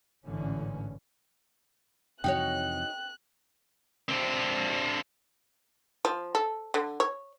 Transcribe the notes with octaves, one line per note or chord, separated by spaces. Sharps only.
A1 G#2 D3 E3 C#4
F2 C3 E3 D#4 F#4 C#5 G5 F#6
D3 C4
F3
A4
D3
C#5